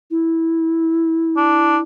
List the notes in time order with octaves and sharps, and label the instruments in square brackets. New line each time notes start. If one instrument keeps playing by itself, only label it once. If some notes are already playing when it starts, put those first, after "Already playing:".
[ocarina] E4
[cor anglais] D4